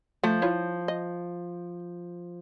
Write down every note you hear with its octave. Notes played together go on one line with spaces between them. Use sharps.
F3 A3
E4 F4 C#5
D#5